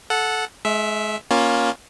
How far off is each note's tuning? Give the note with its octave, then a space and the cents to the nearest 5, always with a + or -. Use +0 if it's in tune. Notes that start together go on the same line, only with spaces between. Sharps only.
A4 -10 F#5 -10
G#3 +35 E5 +0
A#3 +15 C#4 +0 F4 +15